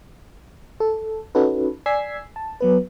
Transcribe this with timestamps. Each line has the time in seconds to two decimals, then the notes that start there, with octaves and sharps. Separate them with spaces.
0.80 A4
1.35 C#4 D#4 F#4 A4 B4
1.86 D5 G#5 E6 G#6 B6 C7
2.36 A5
2.61 F#3 B3 B4